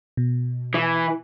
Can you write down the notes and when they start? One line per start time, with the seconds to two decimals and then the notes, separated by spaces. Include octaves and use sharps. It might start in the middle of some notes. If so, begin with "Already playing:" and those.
0.17 B2
0.74 E3